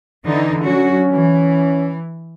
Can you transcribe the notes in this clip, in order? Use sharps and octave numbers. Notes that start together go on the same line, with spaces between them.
D3 E3 D#4
F#3 C#4 F#4
E3